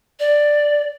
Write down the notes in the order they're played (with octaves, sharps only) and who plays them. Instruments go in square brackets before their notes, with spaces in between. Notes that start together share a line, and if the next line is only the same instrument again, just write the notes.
[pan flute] D5